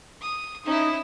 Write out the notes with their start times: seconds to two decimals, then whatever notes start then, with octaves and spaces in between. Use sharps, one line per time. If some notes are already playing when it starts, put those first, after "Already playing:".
0.21 D#6
0.66 C#4 D#4 E4